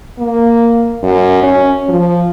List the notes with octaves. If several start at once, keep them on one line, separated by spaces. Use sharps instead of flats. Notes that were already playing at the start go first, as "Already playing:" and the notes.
A#3
F#2
C#4
F3